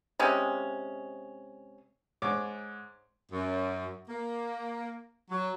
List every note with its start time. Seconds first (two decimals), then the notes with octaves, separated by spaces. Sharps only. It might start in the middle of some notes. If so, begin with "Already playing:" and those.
0.19 C3 G#3 C#4
2.22 G#2 C#5 D6
3.32 F#2
4.09 A#3
5.30 F#3